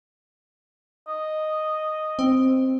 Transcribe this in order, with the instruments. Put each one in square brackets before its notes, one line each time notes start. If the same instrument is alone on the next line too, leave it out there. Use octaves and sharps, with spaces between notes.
[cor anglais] D#5
[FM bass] C4